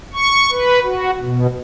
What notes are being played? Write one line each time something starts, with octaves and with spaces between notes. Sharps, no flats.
C#6
B4
F#4
B2